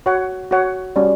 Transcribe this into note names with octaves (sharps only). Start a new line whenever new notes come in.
F#4 C#5 F#5
F#4 C#5 F#5
G3 C#4 F#4 D5